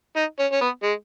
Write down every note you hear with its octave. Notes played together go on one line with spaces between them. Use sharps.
D#4
C#4
C#4
B3
G#3